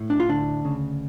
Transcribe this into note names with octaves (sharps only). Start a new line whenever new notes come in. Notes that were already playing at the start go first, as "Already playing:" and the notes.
Already playing: A2
D4
F4
D2 D4
C#3